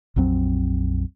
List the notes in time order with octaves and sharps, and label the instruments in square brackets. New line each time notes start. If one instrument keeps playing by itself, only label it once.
[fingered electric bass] A#1 F2 F#3 C4